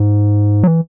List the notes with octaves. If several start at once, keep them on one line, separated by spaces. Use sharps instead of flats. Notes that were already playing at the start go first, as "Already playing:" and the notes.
Already playing: G#2
F#3
E3